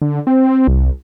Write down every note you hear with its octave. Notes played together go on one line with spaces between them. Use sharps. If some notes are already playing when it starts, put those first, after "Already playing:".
D3
C4
C2